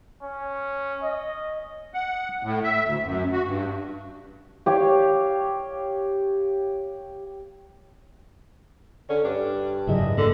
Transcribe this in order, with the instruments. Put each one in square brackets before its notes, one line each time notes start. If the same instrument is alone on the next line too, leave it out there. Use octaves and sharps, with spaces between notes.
[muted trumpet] C#4
D#5
[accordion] F#5
A2
E5
D2
F#2
F#4
G2
[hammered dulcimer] G4 C#5 F5
[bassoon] D3 [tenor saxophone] C#4
[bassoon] G2 [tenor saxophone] D4
[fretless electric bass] G#1 F#2 F#3 [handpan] C#3 G#4 D#5 [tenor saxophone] E4
[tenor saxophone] D3 [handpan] A3 A#3